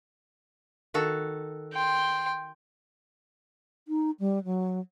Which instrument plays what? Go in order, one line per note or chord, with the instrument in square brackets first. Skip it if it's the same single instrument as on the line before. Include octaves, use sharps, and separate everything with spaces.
[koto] D#3 F#4 A4
[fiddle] G5 C6
[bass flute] D#4
G3
F#3